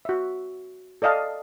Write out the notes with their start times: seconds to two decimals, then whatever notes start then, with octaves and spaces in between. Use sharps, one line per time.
0.05 F#4 E5
1.02 A4 D5 D#5 F5 A5